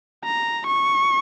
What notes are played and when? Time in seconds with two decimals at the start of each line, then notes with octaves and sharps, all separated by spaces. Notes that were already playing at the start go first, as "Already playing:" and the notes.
0.24 A#5
0.67 C#6